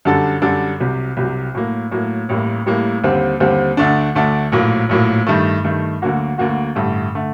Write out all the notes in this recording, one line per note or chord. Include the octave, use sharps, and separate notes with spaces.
F#2 D3 G3 D4 A4
F#2 D3 G3 D4 A4
C2 C3 F#3
C2 C3 F#3
A2 F#3 A#3
A2 F#3 A#3
A1 A2 G3 A#3
A1 A2 G3 A#3
D#2 D3 G3 C4
D#2 D3 G3 C4
D2 D3 A3 D4
D2 D3 A3 D4
A#1 A2 F#3 A#3
A#1 A2 F#3 A#3
G2 D#3 A3
G2 D#3 A3
D2 D3 F#3 A#3 F#4
D2 D3 F#3 A#3 F#4
A1 G2 D3 A3
D3 A3